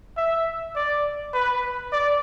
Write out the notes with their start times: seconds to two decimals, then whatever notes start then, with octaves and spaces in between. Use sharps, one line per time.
0.17 E5
0.75 D5
1.34 B4
1.92 D5